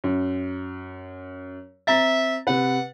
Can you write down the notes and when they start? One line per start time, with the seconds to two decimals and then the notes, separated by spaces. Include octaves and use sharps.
0.04 F#2
1.87 C4 E5 A#5 A6
2.47 C3 B4 F#5